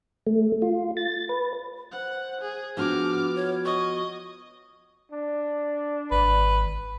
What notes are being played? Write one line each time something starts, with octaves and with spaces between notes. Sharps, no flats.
A3
F4
A6
B4
C5 F#5
G#4
F3 B3 D4 F#4 G5 D6 F6
C#5
D#5 C#6
D4
G#1 B4